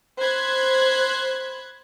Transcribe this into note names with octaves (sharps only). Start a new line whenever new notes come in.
C5 B5 F#6 G#6